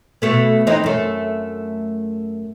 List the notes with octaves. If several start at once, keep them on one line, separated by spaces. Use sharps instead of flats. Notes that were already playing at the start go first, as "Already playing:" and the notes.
B2 A3 B3
E3 C4 D#4
F#2 A3